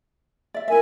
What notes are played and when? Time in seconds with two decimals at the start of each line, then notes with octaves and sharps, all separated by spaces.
0.54 D5 E5
0.68 E4 A#4 E5 G#5